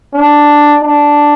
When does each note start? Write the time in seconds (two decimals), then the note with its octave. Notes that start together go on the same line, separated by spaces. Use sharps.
0.14 D4
0.82 D4